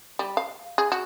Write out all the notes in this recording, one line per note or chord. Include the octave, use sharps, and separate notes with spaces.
G3
F5
G#4
F#4